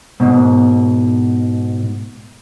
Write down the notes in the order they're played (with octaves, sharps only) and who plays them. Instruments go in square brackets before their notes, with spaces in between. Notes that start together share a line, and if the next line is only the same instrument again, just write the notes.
[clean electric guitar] G#2 B2